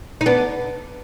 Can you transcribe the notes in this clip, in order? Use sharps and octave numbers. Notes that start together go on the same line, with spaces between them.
D#4
B3 D4